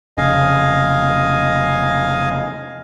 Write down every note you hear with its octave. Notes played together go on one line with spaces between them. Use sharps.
F1 C#3 D#5 F5 G#5